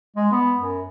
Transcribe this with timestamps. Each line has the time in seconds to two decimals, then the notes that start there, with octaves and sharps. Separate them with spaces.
0.16 G#3
0.32 B3
0.57 F#2